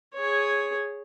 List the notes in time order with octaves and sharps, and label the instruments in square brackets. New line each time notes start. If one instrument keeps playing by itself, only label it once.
[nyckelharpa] G#4 C#5